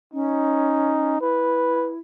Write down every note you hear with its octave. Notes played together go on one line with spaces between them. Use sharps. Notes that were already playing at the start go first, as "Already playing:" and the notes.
C#4 D#4
E4 B4